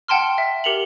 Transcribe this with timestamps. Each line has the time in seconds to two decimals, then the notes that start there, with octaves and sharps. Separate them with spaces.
0.08 F#5 G5 A5 C6 F6
0.38 E5
0.64 G4 A#4 C#7 F7 F#7